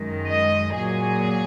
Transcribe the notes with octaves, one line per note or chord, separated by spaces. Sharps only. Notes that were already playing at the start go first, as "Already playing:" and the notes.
Already playing: F#2 D#3 G#3
D#5
A#2 F#3 G#4